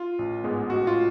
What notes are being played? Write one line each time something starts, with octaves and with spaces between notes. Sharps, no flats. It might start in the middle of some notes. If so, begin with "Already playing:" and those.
Already playing: F4
A1
G#2 G#3 B3
A1 F#4
F4